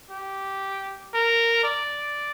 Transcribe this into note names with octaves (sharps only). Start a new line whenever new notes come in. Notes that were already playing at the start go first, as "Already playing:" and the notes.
G4
A#4
D5